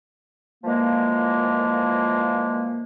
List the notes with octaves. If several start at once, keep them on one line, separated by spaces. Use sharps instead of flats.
A#2 E3 F3 G#3 A#3